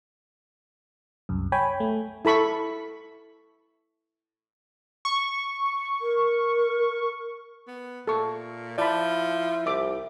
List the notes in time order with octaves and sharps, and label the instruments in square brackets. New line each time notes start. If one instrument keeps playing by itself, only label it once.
[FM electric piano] C2 F#2
C#5 G5 G#5 B5
A3
[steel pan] E4 A4 B5 C#6
[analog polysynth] C#6
[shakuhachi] A#4
[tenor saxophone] B3
[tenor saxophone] A#2 [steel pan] A4 C#6
[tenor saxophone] F3 [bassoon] E4 [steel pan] D5 A5 B5
[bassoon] C2 [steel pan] E5 D6